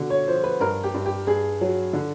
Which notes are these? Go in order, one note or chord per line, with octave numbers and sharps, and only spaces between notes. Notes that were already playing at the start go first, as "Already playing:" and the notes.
Already playing: B2 D3
C#5
F3 C5
B4
G2 A#4
G4
G2
G4
G2 G#4
F#3
D3